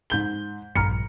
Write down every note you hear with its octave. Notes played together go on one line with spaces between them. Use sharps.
G#2 G6 G7
A#1 G2 A#5 F6 C#7